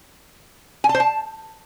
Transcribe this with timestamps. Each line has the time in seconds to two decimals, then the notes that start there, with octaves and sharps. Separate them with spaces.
0.84 G#5
0.89 A5
0.95 C5
1.00 A5